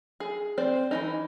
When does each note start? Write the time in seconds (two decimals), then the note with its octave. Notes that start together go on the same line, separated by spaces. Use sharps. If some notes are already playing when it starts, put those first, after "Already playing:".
0.20 G#4
0.58 C4 C5 D5
0.91 E3 F3 D#4